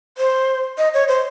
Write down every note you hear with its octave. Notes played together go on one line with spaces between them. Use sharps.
C5
D#5
C#5
C5